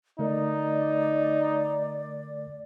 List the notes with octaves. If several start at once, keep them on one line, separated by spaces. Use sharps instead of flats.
D3 A3 D#4 A#4 D5